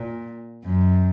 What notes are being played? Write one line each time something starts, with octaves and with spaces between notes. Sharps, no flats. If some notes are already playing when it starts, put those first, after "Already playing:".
Already playing: A#2
F#2